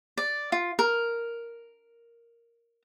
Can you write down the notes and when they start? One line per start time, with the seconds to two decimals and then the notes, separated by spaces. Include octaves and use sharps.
0.17 D5
0.52 F4
0.79 A#4